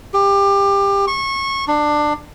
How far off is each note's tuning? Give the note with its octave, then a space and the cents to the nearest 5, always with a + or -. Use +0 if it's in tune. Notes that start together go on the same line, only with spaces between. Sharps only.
G4 +25
C#6 -25
D4 +20